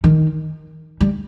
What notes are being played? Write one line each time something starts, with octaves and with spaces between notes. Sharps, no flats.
D#3
G3